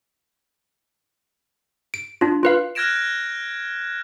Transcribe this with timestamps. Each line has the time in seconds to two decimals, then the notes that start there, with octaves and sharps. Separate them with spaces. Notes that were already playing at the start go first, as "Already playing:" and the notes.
1.94 D7
2.21 D4 F4
2.43 F4 B4 F5
2.75 F6 F#6 G#6 A#6 D7 E7